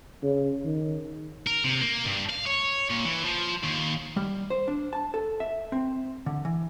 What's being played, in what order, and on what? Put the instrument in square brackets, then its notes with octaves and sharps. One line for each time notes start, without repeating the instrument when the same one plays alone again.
[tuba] C#3
D#3
[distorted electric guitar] A#4
C3
A#3
G2
F5
C#5
A#2
E3
F3
D#2
[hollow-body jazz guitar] G3
C5
D4
A5
A4
E5
C4
D3
E3